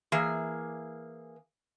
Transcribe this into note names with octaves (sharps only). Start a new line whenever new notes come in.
E3 A#3 G#4